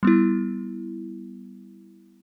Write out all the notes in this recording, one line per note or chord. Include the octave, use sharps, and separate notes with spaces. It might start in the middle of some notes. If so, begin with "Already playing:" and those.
G3 B3 E4